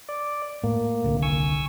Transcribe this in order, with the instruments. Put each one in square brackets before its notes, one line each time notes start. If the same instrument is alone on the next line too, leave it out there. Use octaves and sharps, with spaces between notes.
[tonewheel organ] D5
[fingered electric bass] A2 [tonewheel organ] A#3
[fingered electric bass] D#1 C2 D3
[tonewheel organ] G#5 C#6 E6